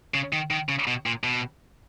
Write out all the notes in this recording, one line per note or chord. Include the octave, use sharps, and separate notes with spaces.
C#3
D#3
D#3
C#3
B2
A#2
B2